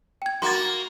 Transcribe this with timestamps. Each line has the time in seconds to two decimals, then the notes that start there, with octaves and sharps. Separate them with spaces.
0.22 G5 G#6
0.42 A#3 F#4 C6 A6